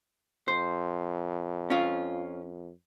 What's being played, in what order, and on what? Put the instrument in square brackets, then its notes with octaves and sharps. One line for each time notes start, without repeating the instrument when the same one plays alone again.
[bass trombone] F2 [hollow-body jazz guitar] C5
[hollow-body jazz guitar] C#4 F4